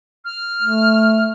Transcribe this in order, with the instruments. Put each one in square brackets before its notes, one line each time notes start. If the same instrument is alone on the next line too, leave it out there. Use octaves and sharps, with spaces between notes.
[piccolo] F6
[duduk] A3